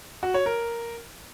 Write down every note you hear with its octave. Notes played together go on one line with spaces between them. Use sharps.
F#4
C#5
A#4